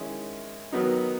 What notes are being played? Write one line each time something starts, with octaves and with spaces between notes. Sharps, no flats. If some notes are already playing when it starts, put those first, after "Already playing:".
Already playing: D#3 G#3 C#4 E4
D#3 F#3 B3 D#4